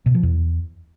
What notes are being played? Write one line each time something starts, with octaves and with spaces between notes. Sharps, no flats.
B2
F3
E2